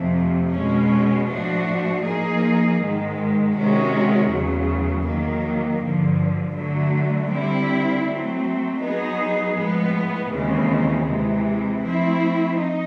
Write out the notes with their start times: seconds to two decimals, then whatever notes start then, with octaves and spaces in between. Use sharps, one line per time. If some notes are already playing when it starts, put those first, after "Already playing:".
Already playing: F2 C3 F3 A3
0.52 B2 G#3 C#4
1.28 A2 F3 A3 D4 F#4
2.04 F3 A#3 D#4 G#4
2.78 G#2 D#3 G#3
3.53 C3 D#3 G#3 C#4 F#4
4.29 E2 C#3 F#3 A3
5.04 D#3 F#3 A#3
5.79 G2 D3 F3
6.55 D3 F#3 A3
7.30 D3 G3 C4 E4
8.06 F#3 A3 C4
8.81 F#3 B3 D#4 G#4
9.56 A2 F3 G#3 B3
10.31 D#2 C#3 E3 G#3 C4
11.06 C3 E3 G#3
11.82 F3 A3 C4 E4
12.56 D#4